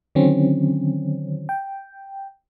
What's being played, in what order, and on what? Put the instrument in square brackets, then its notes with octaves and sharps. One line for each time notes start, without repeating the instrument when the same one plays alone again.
[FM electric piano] D3 D#3 F#3 C4 C#4
G5